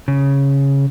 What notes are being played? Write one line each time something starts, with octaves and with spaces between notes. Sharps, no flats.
C#3